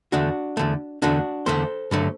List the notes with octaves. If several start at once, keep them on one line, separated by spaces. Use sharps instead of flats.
E2 D3 A3 D4 F#4
E2 D3 A3
E2 D3 A3 D4 F#4
E2 D3 A3 A4 C5
G2 D3 F#3 A3